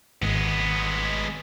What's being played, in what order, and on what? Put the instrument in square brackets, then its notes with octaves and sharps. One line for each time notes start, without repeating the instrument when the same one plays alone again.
[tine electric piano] G#1 [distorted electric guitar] G#3 B3